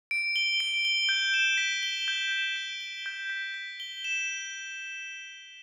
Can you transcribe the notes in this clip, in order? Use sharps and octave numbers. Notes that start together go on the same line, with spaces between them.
D7
G7
D7
G7
G6
E7
B6
G7
G6
E7
D7
G7
G6
B6
B6
G7
E7